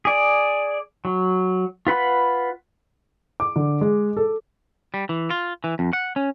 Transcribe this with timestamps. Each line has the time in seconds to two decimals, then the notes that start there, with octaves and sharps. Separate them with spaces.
0.05 G#4 D5
1.05 F#3
1.87 F4 B4 F#5 B5
3.40 D6
3.56 D3
3.81 G#3
4.17 A4
4.94 G3
5.09 E3
5.30 F4
5.64 E3
5.79 F2
5.93 F#5
6.16 C#4